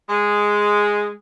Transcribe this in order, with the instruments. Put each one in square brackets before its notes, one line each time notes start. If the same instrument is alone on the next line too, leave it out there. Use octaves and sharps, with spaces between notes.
[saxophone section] G#3